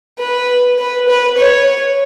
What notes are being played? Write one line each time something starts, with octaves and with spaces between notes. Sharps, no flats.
B4
B4
B4
C#5